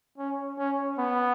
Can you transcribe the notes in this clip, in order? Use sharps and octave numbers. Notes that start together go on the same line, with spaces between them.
C#4
C#4
B3